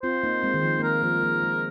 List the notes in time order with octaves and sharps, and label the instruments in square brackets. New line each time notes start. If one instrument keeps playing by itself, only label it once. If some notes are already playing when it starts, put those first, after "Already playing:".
[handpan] C4 F4 [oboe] C5
[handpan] A#3 D#4
G#3 C4
D#3
F3
A#3
[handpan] G#3 [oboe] A#4
[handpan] F3 A#3
G#3
F3 A#3
G#3